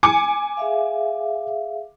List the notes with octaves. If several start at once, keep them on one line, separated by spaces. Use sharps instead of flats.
G#5 D6 C#7
G#4 E5 F5